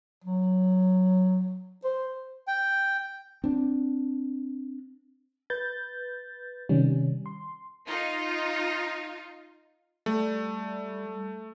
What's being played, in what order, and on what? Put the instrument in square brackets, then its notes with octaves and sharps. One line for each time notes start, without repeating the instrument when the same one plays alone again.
[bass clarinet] F#3
C5
[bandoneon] G5
[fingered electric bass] C4 D4
[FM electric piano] B4 G6 A6
C3 D#3 G3 C#4
C6
[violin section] D#4 F4
[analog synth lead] G3 [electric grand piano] A3